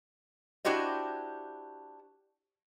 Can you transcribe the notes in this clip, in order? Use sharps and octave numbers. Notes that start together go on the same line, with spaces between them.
D4 E4 F#4 G4 C5 D#5